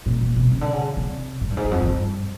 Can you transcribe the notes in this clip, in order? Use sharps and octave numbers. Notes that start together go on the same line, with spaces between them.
A#2
A#2
B2
C#3
D3
C#3
C3
G#2
G2
G#2
E2
F2
G#2
G2